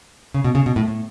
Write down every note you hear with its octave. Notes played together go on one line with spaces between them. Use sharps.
C#3
B2
C#3
B2
A2
A2